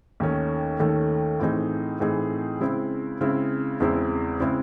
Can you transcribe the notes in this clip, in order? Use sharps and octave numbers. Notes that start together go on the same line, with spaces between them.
D#2 D#3 A3 C#4
D#2 D#3 A3 C#4
A2 E3 C4 D#4 G#4
A2 E3 C4 D#4 G#4
C#3 G#3 C4 E4
C#3 G#3 C4 E4
E2 C#3 G#3 C4 E4
C#3 G#3 C4 E4